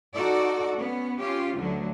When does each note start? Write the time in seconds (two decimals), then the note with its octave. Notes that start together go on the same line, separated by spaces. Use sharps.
0.14 D#4 F#4 A4 D5
0.76 B3 C#4
1.19 C#4 F4 G4
1.57 D2 D3 F#3